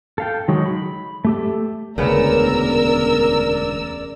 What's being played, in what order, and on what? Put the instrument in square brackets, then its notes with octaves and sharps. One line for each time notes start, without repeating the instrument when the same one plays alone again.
[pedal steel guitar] A4 F5 G5
D#3 F#3 G#3
B5
A3 G4 A4
[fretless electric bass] E1 D2 [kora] C#3 B3 [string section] A#4 E6 [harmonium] D5